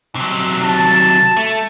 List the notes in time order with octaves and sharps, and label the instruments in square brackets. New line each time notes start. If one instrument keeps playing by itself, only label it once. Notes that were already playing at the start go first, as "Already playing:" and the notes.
[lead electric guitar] C3 F#3
[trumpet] A5
[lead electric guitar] A3